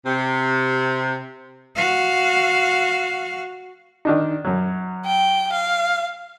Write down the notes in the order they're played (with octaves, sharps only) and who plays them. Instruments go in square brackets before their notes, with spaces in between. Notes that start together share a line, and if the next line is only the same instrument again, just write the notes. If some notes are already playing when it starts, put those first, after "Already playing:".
[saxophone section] C3
[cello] F#4 F5
[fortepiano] D#3 D4 D#4
F#2 F#3
[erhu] G5
F5